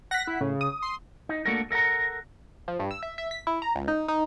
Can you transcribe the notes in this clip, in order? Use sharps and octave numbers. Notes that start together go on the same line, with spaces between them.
F#5 F#6 A#6 B6
E4
A2 C#3
D#6
C6
D#4
A3 A#3 D4 F#4 A4 A#4
A4 A#4 E5 F#5 A#5
F3
G2
E6
E5
E5
B6
E4
A#5
C#2
D#4
D#4